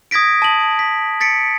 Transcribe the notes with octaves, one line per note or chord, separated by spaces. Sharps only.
D#6 G#6 A#6 B6 D7
A5 F#7
B6
A6 B6 C#7 D7